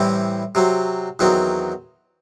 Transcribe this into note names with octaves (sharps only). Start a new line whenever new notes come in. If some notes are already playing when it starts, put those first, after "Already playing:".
Already playing: A2 E3 G3 C4 E4
C3 F#3 C4
E2 D#3 F#3 C4